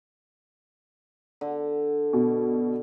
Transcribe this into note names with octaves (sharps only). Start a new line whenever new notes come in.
D3
B2